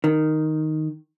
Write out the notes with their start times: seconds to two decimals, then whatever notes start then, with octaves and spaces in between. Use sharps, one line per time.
0.04 D#3